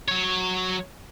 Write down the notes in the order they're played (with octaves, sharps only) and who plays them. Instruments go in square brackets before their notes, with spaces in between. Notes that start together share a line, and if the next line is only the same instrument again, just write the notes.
[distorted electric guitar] F#3 C#5